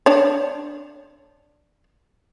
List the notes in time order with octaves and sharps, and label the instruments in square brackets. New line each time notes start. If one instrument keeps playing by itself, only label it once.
[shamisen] D4 C#5